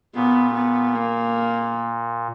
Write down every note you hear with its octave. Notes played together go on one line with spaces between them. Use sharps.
A#2 B3
B3
A#3